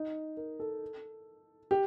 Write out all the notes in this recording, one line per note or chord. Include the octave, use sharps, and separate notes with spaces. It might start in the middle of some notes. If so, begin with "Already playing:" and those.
Already playing: D#4
A#4
A4
G4